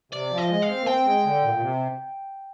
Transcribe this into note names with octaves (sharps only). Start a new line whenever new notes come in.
C3 D5
F3
D#5
G#3
F5
C4
A#3
C4 G5
G#3
D3
A#2
A#2
C3